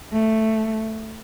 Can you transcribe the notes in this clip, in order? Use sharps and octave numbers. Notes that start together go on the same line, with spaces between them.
A3